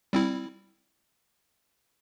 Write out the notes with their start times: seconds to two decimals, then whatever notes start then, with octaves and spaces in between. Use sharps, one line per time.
0.13 G3 C4 E4